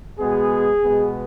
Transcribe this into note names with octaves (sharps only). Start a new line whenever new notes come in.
B2 G#3 B3 G#4
B2 G#3 B3